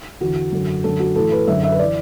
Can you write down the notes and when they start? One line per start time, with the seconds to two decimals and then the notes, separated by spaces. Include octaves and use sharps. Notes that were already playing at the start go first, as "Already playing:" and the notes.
0.21 E2 D3 F#4
0.52 F#2 D3
0.84 F#2 D3 A4
1.00 F#4
1.16 A2 E3 A4
1.32 B4
1.47 F#2 D3 E5
1.63 E5
1.72 B4
1.79 E3 D5